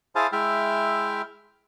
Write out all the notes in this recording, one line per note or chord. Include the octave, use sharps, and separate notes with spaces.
E4 G#4 C5 F5 G#5 A5
G#3 E4 E5 G5 F6